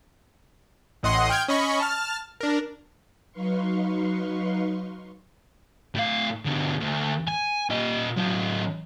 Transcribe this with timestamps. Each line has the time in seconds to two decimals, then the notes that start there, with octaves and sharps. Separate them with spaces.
1.03 A1 A2 D#5 F#5 C6 D#6
1.30 G5 F6 G6 G#6
1.48 C#4 D#5 B5 C#6
1.80 A5 F6
2.41 D4 A#4
3.32 F#3 D#4 B4 F5 C6 C#6
5.95 A2 F5
6.46 B2 D3
6.81 D2
7.27 G#5
7.70 A#2 D#5
8.17 F#3 C4